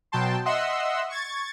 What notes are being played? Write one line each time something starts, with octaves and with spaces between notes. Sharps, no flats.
B2 F#3 G5 A5 C6
D#5 E5 F#5 C6 E6
C#6 G#6 A6